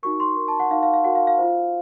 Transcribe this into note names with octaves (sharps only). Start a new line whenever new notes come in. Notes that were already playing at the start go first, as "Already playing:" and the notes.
D#4 F#4 A#4 C#6
C6
D#4 F#4 A#4
A5
F#5
D#4 F#4 A#4 F5
F5
F5
D#4 F#4 A#4 F#5
F5
F5
F4 C5